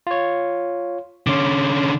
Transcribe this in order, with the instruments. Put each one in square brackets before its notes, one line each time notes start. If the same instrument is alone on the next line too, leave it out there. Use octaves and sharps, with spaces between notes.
[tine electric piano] F4 C#5
[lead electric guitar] D3 C#4 [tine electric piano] C6 D6